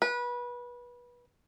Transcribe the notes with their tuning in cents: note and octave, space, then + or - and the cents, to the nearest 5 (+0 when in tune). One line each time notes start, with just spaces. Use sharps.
B4 -25